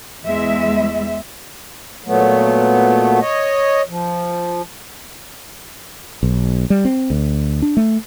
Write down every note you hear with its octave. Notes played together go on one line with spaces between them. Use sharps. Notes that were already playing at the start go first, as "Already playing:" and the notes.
E2 G#3 E5
A#2 F#3 A3 B3
C#5 D#5
F3
B1
G3
C4
D2
D4
A3